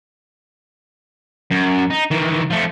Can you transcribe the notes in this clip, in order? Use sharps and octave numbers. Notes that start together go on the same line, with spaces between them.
F#2
D#4
D#3 E3
F3 A3